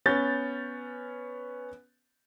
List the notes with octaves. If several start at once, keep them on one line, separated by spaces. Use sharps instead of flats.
B3 C#4 G6 A6